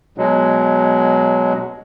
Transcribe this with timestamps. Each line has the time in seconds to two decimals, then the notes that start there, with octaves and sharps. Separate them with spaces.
0.18 B2 F#3 G#3